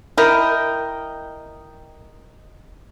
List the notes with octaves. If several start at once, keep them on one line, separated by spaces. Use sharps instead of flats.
E4 A#4 D#5 G5